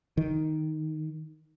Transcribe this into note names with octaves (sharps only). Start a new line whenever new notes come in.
D#3